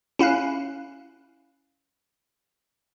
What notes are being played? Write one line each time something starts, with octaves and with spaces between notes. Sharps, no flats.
C#4 E4 F5 F#6